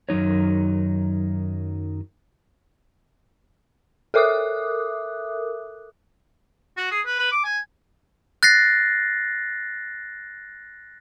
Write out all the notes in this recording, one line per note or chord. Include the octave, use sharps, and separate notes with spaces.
F#2 D#3 F#3 D#4 C#5
A4 A#4 E5 D6 D#6 F#6
F#4
G#4
B4
B4
D6
G#5
F#6 A6 A#6 C7